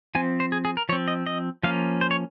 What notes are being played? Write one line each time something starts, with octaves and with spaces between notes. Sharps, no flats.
F3 C4 G#5
C5
G#4
G#4
A#4
F3 C4 C#5
D#5
D#5
F3 A#3 C#4 F5
C5
C#5